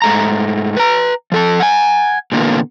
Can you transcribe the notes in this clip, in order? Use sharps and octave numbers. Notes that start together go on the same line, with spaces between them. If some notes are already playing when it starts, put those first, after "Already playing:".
G#2 A3 A#5
B4 A#5
F3 A4 A5
F#5 G#5
A#2 D3 E3 A#3 B3